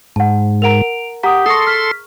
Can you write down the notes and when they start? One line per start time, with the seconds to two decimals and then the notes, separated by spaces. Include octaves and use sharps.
0.16 G#2 F#5 A5
0.62 A#4 F#5 A#5 D7 F7
1.24 G4 F#5 A#5 D#6
1.46 G#4 A4 C6 C#6 D#6 A#6
1.67 F6 B6